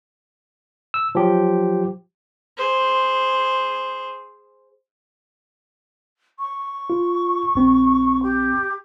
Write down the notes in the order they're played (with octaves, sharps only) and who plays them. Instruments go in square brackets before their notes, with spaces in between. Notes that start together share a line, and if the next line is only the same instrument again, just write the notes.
[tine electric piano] E6
F3 F#3 G4
[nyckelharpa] G#4 C5
[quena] C#6
[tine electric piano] F4
A#1 C4
[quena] G4